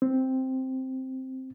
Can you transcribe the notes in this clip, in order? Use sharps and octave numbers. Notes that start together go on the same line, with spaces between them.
C4